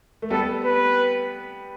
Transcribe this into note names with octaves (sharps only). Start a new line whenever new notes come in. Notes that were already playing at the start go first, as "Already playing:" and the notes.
A3
G3 B3 A4
B4